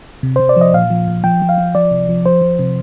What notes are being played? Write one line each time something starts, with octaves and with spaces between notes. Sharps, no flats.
C3
C3 C5
D5
F3 D#5
A#2 F5
F3
A#2
F3 G5
F3
F5
F3
F3 D5
C3
F3
F3 C5
F3
C3